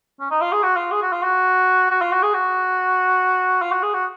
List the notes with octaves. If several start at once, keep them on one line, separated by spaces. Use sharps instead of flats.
C#4
D#4
F4
G#4
F#4
F4
G#4
F#4
F4
F#4
F#4
F4
F#4
G#4
F#4
F4
F#4
G#4
F#4